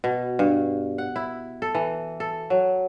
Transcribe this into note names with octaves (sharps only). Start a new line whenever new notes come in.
B2
G2
F#5
E4
A4
E3
A4
F#3